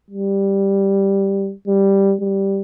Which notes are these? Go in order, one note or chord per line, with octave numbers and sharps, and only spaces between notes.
G3
G3
G3